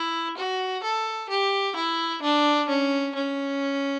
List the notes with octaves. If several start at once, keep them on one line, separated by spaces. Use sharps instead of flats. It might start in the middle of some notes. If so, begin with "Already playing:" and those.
Already playing: E4
F#4
A4
G4
E4
D4
C#4
C#4